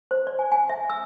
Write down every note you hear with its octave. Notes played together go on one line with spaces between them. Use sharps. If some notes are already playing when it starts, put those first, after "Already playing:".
C5
D5
G#5
G#5
E5
E6